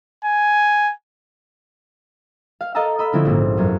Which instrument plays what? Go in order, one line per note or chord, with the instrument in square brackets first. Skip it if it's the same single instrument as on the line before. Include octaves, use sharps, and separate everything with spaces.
[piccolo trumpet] G#5
[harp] F5
A4 D#5 F5 A5 A#5 E6
D#5 B5 E6
D3 F3 C4 C#4 E4
A#1 G#2
E1 F#2